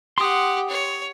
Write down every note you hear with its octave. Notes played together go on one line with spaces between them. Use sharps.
G4 F#5 C6 D#6
C#5